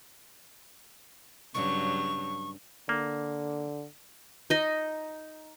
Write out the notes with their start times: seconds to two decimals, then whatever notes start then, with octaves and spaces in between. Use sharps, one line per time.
1.54 G2 C#3 F#3 C#6
2.89 D3 A#3
4.50 D#4 D#5